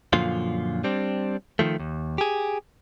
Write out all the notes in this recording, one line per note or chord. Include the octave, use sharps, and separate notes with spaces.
F#2 A#2 D3 F3 F4
G3 C4 D4
D#3 F3 A3
D#2
G4 G#4